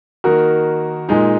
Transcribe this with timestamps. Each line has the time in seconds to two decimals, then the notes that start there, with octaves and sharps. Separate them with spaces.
0.24 D#3 A#3 D#4 F#4 A#4
1.09 A#2 G#3 D#4